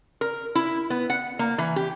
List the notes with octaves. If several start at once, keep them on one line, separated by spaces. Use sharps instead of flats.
A#4
E4
B3
F#5
A#3
E3
G4